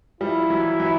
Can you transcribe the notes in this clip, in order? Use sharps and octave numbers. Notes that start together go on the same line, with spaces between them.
F3 G3 E4
E3 F#3
E3 F#3